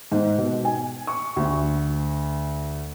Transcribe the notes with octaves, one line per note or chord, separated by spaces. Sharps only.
G#2
B2
G#5
C#6
D2